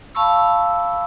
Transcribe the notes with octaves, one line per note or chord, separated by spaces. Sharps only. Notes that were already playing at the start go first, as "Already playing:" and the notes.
F5 A5 B5 C#6 E6